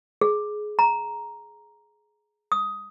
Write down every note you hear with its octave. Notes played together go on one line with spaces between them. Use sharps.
G#4
A#5
D#6